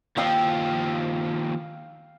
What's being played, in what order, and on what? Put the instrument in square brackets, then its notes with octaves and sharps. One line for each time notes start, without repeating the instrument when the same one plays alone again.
[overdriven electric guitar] D#2 F3 [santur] F5 G5 E6